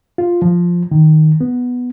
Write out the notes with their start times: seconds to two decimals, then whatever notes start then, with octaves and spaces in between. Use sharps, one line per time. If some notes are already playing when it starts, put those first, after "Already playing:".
0.18 F4
0.42 F3
0.91 D#3
1.41 B3